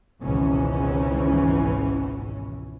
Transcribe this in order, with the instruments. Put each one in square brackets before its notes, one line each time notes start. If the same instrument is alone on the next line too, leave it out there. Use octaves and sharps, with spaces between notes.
[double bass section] G#1 C#2 G#2 B2 E3 C#4